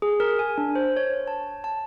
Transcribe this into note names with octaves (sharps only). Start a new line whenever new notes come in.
G#4
A#4
G#5
D4
C5
C#5
A5
A5